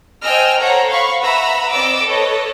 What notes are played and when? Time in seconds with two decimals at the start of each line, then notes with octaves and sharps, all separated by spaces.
0.23 C5 D#5 G5 G#5 E6 F6
0.60 A4 C5 C#5 F#5 A#5
0.89 F5 B5 C#6
1.22 B4 E5 F#5 A#5 B5 E6
1.72 C4 D5 D#5 D6 E6
2.04 A4 B4 C#5 D#5